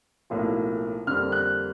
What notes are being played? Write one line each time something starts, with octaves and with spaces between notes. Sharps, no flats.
B1 A2 F3 A#3
F2 D3 G3 A#3 F6
F#6